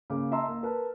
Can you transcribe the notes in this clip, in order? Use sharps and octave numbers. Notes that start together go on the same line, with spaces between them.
C#3 A#3 D6
D#5 E5 A5 A#5 C6 E6
A#3
A#4 B4 A5